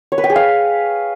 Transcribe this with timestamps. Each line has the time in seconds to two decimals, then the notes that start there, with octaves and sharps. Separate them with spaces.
0.12 C#5
0.18 B4
0.24 G5
0.30 G#4
0.36 F5